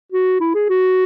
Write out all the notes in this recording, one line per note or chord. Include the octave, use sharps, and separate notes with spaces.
F#4
E4
G#4
F#4